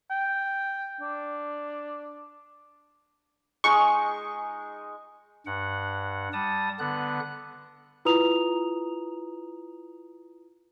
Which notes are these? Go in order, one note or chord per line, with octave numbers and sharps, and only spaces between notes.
G5
D4
G#3 D#4 C#6
G2 F#5
G3 A5 D#6
D3 B3 F#6
E4 F4 B4 A#5 D#6 F7